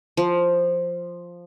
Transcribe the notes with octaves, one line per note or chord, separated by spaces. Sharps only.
F3